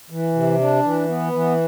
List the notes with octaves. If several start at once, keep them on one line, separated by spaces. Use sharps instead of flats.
E3
C3
D4
E3
B3
E3